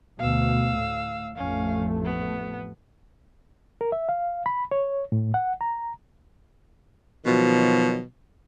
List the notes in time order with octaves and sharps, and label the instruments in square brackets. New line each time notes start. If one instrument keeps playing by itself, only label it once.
[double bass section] D2 B2 [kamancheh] F5 E6
[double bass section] A2
[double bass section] A1 F2 A3 [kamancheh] C#4 F5
[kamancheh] B3
[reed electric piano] A#4
E5
F5
B5
C#5
A2
F#5
A#5
[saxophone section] B2 D#3 F3 F#3